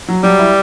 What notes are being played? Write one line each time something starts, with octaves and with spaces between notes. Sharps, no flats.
F#3
F#3 G3
E4